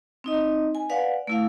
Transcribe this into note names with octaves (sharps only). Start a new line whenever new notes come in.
C4 D#4 D#5
G#5
B4 D5 F5 F#5
A3 E4 F5